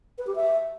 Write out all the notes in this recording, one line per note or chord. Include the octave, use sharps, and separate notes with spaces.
B4
G4
E5